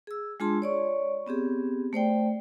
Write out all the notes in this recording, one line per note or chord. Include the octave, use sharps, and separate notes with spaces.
G#4 E6
G#3 D4 F4 G#4 A5 C6
C#5 D5 C#6
B3 C4 G4 G#4
A3 C5 D5 G5